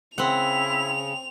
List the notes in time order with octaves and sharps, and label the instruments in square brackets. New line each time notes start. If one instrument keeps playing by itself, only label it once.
[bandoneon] C#3 [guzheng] C4 F#5 [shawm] E4 [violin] F7